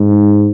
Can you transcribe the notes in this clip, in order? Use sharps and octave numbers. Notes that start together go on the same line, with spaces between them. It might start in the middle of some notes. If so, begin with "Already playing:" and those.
Already playing: G#2